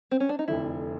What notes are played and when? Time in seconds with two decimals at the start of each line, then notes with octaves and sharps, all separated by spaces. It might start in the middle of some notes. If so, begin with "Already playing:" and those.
0.11 C4
0.20 C#4
0.29 D4
0.39 D#4
0.48 F1 F2 D3 E4